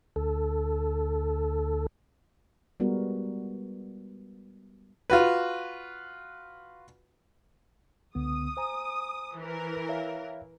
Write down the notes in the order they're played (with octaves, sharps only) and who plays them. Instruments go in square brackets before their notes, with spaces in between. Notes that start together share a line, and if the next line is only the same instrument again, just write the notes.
[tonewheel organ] D2 A4
[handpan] G3 G#3 B3 F#4 A#4
[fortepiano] F4 F#4 B4
[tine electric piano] C#2 D3 B3 [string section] D#6
[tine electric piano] C5 G#5 A#5
[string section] E3 A#4
[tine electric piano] C#5 E5 F5